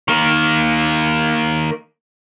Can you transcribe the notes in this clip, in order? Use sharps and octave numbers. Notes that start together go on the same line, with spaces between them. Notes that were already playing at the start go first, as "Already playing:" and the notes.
D#3 A#3